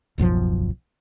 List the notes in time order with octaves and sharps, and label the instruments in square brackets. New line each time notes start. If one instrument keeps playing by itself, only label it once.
[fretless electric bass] D1 B1 F#2 F3